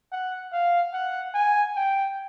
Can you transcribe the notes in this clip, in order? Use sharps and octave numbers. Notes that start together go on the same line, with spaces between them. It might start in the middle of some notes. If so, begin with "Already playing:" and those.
F#5
F5
F#5
G#5
G5